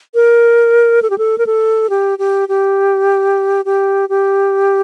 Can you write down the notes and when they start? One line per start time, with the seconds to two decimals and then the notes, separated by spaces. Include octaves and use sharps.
0.14 A#4
1.02 A4
1.10 G4
1.18 A4
1.38 A#4
1.46 A4
1.90 G4
2.19 G4
2.49 G4
3.65 G4
4.09 G4